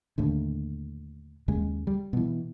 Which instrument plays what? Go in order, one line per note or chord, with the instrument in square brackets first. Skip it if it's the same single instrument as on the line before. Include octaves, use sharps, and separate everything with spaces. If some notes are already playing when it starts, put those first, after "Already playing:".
[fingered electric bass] D#2 A2 D3
D#2 C#3 G#3
G3
B2 E3